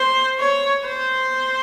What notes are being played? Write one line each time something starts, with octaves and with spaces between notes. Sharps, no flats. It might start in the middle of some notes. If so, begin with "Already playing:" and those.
Already playing: C5
C#5
C5